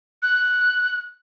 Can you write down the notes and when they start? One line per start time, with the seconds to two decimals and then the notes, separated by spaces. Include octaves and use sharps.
0.23 F#6